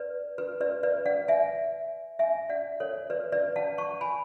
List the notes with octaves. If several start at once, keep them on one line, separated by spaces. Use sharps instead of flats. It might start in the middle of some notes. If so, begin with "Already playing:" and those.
Already playing: B4 D5
B4
B4 D5
B4 D5
D5 F#5
E5 G#5
E5 G#5
D5 F#5
A4 C#5
B4 D5
B4 D5
F#5 A5
A5 C#6
G#5 B5